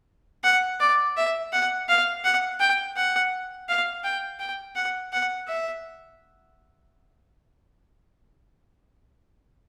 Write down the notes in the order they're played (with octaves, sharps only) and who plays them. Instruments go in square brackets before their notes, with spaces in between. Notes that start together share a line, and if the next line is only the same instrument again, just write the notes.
[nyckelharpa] F#5
D5
E5
F#5
F5
F#5
G5
F#5
F5
G5
G5
F#5
F#5
E5